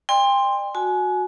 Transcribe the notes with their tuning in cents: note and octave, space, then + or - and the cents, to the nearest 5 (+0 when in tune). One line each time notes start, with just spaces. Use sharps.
D5 +35 G5 +35 C6 +0
F#4 -15 G#5 +30